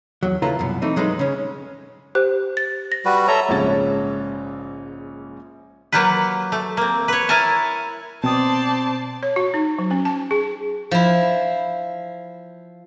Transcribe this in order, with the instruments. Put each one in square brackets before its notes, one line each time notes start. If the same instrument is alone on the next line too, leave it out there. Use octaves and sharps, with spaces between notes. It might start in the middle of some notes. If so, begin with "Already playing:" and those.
[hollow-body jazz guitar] E2 F#3
C#3 E4 F4 A4 B4 A#5
C2 F#2 B2
E3 A3 C4 D#4
F#3 G#3 A3 D#4 B4
C#3 C#4
[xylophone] G4 C5 F#6
A6
A#6
[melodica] G3 F#4 B4
[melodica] A4 E5 A#5 [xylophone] C#5
[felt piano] A#1 G#2 C#3 C#4 A6
[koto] F#3 A#3 F4 G4 B4
A3
A#3 C4
B4 C#5
E4 A#4 C#5 G#5 A5
[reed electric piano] B2 G5 D#6 [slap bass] C4 [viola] C5 D5 [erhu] A5
[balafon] C#5
F#4
D#4
F#3
C#4
A5
G#4
[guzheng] F3 E4